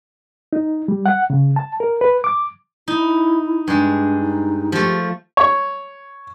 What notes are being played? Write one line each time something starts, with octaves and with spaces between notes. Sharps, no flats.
D#4
G3
F#5
C#3
A5
A#4
B4
D6
D#4 E4
G2 G#3 D4
D#4
F3 A3 G4
C#5